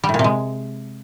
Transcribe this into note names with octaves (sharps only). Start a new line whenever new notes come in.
G3
A2
A#2
C3
G#3